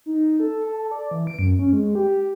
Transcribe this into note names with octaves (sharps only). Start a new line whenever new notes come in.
D#4
A4
A4
A4
D5
E3
D7
F#2
C#4
G#3
G4